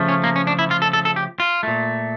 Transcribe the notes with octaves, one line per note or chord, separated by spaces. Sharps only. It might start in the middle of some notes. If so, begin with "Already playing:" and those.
Already playing: C#3 F3 A3
C#4
A#3
C#4
D4
E4
F4
A4
A4
A4
G4
F4
A#2 A3